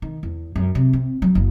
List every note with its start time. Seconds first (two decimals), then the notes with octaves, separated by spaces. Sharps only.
0.02 D#3
0.23 E2
0.56 F#2
0.75 C3
0.93 C4
1.22 F#3
1.35 F#1